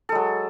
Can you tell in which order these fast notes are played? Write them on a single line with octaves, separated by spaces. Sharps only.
A4 G#3 F#3